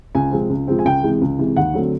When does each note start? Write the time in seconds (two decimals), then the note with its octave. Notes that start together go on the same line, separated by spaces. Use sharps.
0.15 C#2 G#5
0.32 C3 F3 G#3 C4
0.50 C#2
0.68 C3 F3 G#3 C4
0.79 G#5
0.85 C#2 G5
1.03 C3 E3 G#3
1.21 C#2
1.39 C3 E3 G#3
1.57 D#2 F#5
1.74 D3 F#3 A3 C4